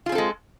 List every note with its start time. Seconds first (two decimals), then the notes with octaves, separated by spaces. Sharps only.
0.06 F4
0.09 G#4
0.12 C4
0.15 A4
0.18 G#3